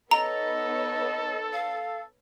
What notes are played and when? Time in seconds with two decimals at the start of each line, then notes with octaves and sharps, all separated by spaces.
0.11 B3 D#4 A4 C#5 D#5 A#5
1.53 F5